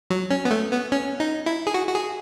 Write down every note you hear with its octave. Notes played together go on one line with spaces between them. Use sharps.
F#3
C#4
B3
A3
B3
C#4
D#4
E4
G#4
F#4
F#4
G#4